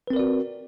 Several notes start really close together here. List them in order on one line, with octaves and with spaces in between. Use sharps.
B4 C4 A#4 D5 F#4